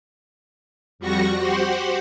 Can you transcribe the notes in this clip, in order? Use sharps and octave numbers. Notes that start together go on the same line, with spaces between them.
F2 G3 F#4 C#6 A#6
F#4 G4 C5 F#5